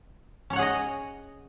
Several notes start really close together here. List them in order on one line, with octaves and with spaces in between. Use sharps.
C#4 C#5 F#5 G#4 D#5